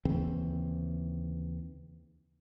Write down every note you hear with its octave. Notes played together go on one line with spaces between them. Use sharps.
D#2 C#3 E3 C4